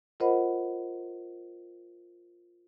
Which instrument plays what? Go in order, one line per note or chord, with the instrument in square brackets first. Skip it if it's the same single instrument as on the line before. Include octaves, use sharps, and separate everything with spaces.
[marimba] F4 A#4 C5 D#5 F#5 B5